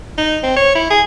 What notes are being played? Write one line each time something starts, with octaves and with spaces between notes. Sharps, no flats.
D#4
C4
C#5
E4
G#4